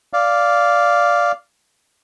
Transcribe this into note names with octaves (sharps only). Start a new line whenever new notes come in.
D5 F5